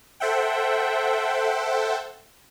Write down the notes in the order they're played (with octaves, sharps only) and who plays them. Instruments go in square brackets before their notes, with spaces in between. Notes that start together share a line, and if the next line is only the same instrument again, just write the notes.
[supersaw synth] A4 C5 E5 F#5 G5